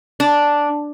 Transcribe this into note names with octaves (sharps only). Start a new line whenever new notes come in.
D4